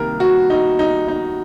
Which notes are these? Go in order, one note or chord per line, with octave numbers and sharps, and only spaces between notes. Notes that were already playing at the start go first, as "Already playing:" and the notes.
Already playing: C2 C3 D#3 A#3 A#4
F#4
D#4
D#4
D#4